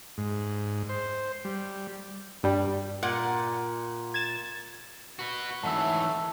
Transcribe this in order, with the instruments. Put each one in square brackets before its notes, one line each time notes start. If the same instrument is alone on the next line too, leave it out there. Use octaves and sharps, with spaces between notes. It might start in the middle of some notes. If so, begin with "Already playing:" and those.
[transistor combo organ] G#2
C5
G3
[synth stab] G2 G3
[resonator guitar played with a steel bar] A#2 [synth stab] F#5
[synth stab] G#6 A6 E7
[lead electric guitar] F#4 B4
[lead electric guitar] G#2 E3 [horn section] F#3 A3 [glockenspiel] A5 E6